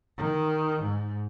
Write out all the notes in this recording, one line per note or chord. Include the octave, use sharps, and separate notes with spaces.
D#3
G#2